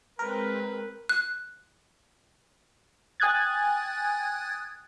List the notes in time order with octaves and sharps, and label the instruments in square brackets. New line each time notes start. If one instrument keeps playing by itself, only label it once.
[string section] G#3 C4 [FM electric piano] A#4 [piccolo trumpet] B4
[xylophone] F#6
[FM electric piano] G5 G#5 D#6 F#6 G#6 A6